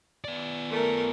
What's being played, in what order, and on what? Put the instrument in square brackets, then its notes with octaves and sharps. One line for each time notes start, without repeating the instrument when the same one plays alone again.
[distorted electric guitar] B3 D5
[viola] A3 A#4